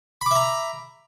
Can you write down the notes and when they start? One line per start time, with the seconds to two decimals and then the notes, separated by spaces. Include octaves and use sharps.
0.21 B5
0.26 D6
0.31 E5
0.36 A#5